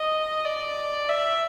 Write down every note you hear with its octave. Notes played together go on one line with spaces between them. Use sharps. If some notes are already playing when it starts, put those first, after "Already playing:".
Already playing: D#5
D5
E5